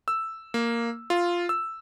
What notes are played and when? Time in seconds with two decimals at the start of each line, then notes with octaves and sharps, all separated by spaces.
0.08 E6
0.54 A#3
1.10 F4
1.49 E6